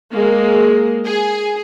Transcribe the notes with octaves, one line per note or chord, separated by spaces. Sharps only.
G#3 A#3
G#4